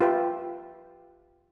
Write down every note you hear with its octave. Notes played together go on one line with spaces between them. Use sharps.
F4 G4 B4 E5 G5